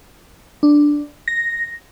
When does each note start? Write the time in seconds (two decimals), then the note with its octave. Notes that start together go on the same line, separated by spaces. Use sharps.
0.63 D4
1.28 A#6